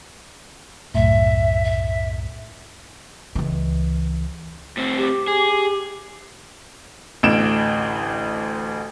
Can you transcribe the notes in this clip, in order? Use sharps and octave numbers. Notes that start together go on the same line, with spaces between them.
C2 F#2 A2 E5
E5
C#2 E3
A2 C4
G4
G#4
A1 D2 D7 E7